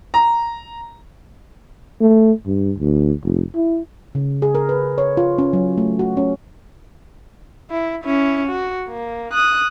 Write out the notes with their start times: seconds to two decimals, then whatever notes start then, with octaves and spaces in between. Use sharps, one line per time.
0.14 A#5
2.01 A3
2.47 G2
2.78 D2
3.24 F1
3.55 E4
4.15 C#3
4.42 G#4
4.55 A#4
4.69 B4
4.98 C#5
5.17 F4
5.38 C#4
5.53 F#3
5.78 A3
5.99 F#4
6.17 C#4
7.71 E4
8.04 C#4 E4
8.47 F#4
8.88 A#3
9.33 D#6 F#6